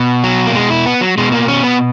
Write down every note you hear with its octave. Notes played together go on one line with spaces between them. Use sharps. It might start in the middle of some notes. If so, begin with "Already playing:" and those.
Already playing: B2
F#3
A#3
G#3
E4
B3
F#3
B2 G#3
A#3
C#4
B3